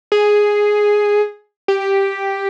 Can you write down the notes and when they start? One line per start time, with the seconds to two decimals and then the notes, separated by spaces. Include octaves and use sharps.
0.12 G#4
1.68 G4